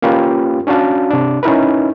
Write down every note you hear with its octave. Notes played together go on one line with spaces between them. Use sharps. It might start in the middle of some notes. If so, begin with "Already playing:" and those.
A#3 C#4 F4 G4 A#4 B4
C#4 D4 F#4 F5 A5
C3 D4
C#4 D#4 E4 A#4 B4